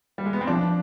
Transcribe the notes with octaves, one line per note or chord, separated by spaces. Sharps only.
G3
G#3
B3
C4
F3 D4